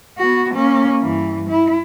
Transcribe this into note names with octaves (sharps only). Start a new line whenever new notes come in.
B3 F#4
A#3 C#4
G2 E3
E4